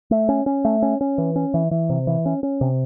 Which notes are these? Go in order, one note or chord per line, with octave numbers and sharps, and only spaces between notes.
A3
C#4
C#4
A3
C#4
C#4
E3
C#4
E3
E3
C3
E3
C#4
C#4
C3